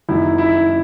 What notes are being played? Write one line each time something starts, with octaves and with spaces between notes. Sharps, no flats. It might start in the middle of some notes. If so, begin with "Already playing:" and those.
F#1 F#2 D#3 E4
E4